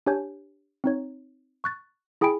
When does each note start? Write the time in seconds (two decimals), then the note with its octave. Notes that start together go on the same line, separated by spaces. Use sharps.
0.06 D4 G4 C#5 G#5 G6
0.84 C4 D#4 C#5
1.64 C#6 F#6 A6
2.21 E4 G#4 G5 G#5 B5 D7